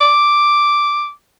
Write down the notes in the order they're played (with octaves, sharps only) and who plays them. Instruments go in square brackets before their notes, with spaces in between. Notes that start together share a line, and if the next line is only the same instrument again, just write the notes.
[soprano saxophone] D6